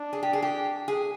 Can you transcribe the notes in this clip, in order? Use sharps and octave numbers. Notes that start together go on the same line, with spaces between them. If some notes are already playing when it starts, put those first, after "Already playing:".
Already playing: D4
G#4
G4
G#4
G4
G#4